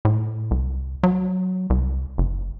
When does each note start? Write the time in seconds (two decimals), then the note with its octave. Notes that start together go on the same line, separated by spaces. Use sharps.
0.05 A2
0.51 C2
1.03 F#3
1.70 C2
2.18 F#1